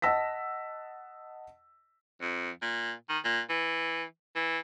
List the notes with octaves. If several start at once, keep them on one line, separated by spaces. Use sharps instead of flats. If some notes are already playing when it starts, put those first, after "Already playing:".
D#5 F#5 A5 E6 A#6 B6
F2
A#2
D#3
A#2
E3
E3